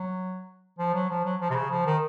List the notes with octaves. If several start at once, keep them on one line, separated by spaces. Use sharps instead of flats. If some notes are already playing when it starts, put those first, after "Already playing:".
Already playing: F#3
F3
F#3
F3
F#3
F3
C3
C#3
F3
D#3